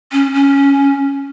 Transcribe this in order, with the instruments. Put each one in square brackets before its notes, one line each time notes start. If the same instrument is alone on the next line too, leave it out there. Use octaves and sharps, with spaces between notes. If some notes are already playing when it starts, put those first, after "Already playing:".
[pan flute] C#4
C#4